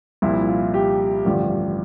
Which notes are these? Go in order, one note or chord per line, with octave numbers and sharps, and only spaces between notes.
C2 A#2 F3 E4
F4
G4
A1 G2 D3 F3